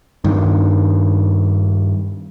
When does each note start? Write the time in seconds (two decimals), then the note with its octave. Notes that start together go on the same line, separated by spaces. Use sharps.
0.24 G2 D#3